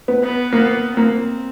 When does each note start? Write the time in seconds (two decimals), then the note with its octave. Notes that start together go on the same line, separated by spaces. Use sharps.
0.08 B3
0.23 B3
0.53 A#3 B3
0.97 A#3 C4